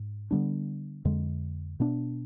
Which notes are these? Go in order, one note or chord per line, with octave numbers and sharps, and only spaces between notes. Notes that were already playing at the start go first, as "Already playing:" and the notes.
Already playing: G#2
D3 G3 B3 D4
F2 D3 G#3
B2 B3 D4